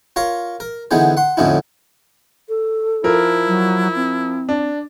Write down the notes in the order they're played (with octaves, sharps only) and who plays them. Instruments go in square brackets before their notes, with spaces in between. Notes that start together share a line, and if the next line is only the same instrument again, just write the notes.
[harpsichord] F4 A#4 C#5 A#5 C6 C#6
A#4
D3 E3 B3 D#4 G#4 C5
F#5 C6
F2 A2 D3 C#4 D#4 E4
[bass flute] A4
[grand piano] F3 A#4 [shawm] E4
[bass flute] F#3
C4
[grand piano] D4